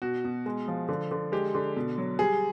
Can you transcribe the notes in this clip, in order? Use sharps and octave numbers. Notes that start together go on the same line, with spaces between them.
B2 F#4
B2
G#3
F3
D3
D3
G#3 G4
D3
B2
F#3
G3 G#4